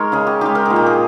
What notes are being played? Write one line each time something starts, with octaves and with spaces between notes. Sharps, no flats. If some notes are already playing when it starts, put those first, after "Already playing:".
Already playing: G#3 D#4 A#4 C#5
C#3 G#4
G4
G#3 D#4 G4
A#4
A#2 G#4
G4
G#4